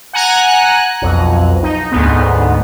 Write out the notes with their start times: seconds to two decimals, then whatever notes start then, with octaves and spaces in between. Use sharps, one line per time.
0.13 F#5 G#5 A#5 F#6
1.02 B1 F2
1.63 D#4
1.92 D2 G#2 B3